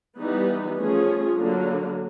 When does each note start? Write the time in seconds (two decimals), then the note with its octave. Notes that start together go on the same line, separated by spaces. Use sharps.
0.19 E3 G3 B3 D#4
0.79 F3 A3 C#4 F4 G#4
1.39 D3 F#3 A#3